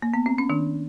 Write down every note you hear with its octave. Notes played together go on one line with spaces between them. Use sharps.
A#3
B3
C4
C#4
D#3 D4